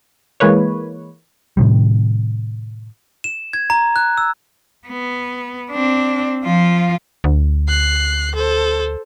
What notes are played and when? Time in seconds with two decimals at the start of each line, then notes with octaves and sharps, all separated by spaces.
0.40 E3 G#3 A#3 B4 C#5
1.57 A2 C3 D#3 G3
3.24 E7
3.53 G#6
3.70 A#5
3.96 F#6
4.18 E6
4.87 B3
5.71 C4 D4
6.44 F3 F4
7.24 D2
7.68 F#6 C7
8.35 A4 C5